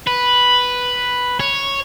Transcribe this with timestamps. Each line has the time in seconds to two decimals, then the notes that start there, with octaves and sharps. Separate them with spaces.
0.07 B4
1.40 C#5